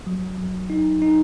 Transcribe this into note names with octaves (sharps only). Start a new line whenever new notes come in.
F#3
F#3
D#4
D#4